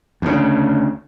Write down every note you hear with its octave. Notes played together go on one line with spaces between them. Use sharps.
D2 C#3